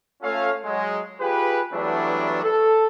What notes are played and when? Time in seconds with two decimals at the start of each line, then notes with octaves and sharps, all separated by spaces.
0.22 A3 C#4 F4 A4 C#5 F5
0.64 F#3 G#3
1.20 F4 G4 G#4 B4
1.72 E3 F#3 G3 A3 B3 D4
2.43 A4